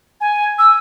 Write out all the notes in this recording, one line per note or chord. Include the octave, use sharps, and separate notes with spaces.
G#5
E6